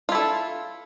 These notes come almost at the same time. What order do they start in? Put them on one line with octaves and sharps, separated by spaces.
F4 E4 A4